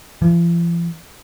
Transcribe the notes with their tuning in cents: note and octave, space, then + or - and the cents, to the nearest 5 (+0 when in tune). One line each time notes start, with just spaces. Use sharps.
F3 -45